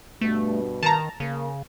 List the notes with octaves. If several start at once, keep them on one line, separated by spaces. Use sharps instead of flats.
G2 B2 A3
D#3 A5 A#5
C#3 A#3